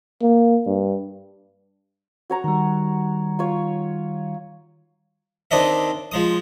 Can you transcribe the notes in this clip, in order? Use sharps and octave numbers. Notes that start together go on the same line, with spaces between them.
A#3
G2
F#4 C#5 A#5
D#3 G3
F4 C#5
D#2 C4 D4 D#5 E5
F3 G#3 D#6